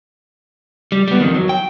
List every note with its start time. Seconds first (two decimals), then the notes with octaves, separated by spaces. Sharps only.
0.92 G3
1.08 G3 B3
1.20 F2 D#3
1.34 F#3
1.49 G5